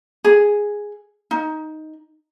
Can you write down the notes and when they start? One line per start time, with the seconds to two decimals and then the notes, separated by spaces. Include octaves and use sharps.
0.24 G#4
1.31 D#4